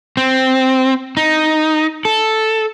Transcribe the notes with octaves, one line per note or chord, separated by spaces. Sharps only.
C4
D#4
A4